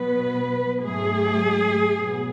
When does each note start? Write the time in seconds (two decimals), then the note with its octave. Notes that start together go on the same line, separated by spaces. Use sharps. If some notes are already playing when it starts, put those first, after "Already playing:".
Already playing: B2 F#3 B3 B4
0.84 G#2 F#3 A3 G#4
1.96 B2 F#3 B3